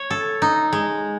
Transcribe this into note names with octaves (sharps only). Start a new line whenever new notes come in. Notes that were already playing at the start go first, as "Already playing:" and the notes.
Already playing: C#5
A4
D#4
G#3